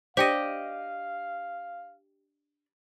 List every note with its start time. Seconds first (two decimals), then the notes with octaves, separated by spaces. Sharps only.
0.17 D4 G4 C5 D5 D#5 F5 G5